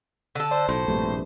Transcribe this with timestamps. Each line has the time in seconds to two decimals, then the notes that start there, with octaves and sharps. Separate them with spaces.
0.35 D3 A4
0.51 C5 D5
0.69 B1 A2 C6
0.88 A#1 G2 C3 A3